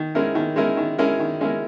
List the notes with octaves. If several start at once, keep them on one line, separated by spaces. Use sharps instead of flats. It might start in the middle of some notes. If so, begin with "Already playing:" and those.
Already playing: D#3
G#3 C#4 E4 A#4
D#3
G#3 C#4 E4 A#4
D#3
G#3 C#4 E4 A#4
D#3
G#3 C#4 E4 A#4